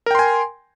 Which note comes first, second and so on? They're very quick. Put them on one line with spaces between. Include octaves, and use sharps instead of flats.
A#4 G5 C6 G#5